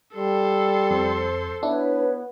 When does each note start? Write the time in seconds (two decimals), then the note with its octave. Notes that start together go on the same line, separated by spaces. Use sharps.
0.16 G3 A4 C6
0.91 F2 C5
1.63 B3 D4 E4 B4 C#5